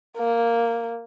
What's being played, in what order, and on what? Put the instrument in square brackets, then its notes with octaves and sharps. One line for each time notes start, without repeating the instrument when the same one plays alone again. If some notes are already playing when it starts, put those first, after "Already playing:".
[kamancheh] A#3